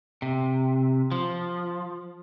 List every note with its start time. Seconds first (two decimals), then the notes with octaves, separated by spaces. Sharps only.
0.22 C3
1.12 F3